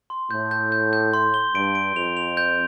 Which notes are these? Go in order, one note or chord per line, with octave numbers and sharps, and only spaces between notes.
C6
A2 G6
G6
G6
G6
C6
G7
G2 D7
D7
F2 F7
F7
G6